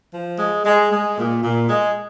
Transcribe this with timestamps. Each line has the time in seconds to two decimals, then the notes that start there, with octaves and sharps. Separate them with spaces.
0.14 F3
0.39 G#3
0.66 G#3
0.91 G#3
1.18 A#2
1.43 A#2
1.69 G#3